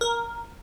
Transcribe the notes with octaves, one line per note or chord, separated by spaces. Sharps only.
A#4